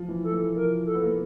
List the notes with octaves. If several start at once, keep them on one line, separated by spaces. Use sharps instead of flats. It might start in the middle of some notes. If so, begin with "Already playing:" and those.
Already playing: F3
E3
A4
E3
F3 A#4
A4
B3
A#3